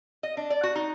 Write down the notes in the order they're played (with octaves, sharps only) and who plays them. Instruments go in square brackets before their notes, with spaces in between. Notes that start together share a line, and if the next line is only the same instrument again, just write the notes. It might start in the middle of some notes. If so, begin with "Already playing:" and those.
[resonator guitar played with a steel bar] D#5
D4
D5
F#4
D#4